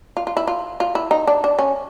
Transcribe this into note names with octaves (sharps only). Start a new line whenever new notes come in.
F4
F4
E4
F4
F4
E4
D#4
D4
D4
C#4